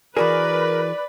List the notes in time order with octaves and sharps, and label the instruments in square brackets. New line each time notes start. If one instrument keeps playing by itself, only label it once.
[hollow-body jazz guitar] E3 F#4 G#4 [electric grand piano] A#4 [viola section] B4 [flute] D5